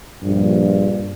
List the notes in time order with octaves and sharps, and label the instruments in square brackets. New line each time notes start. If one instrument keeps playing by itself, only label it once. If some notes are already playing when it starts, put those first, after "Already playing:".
[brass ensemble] A#1 G2